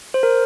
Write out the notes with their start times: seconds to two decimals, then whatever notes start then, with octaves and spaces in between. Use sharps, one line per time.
0.14 C5
0.23 A#4